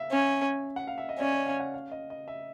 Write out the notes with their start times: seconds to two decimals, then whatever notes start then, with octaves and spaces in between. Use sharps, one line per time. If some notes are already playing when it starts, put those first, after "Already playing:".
Already playing: E5 F5
0.12 C#4
0.76 F#5
0.87 F5
0.98 E5
1.09 D#5
1.19 C#4 D5
1.33 C#5
1.47 F5
1.60 F#5
1.74 F5
1.91 D#5
2.10 D#5
2.28 E5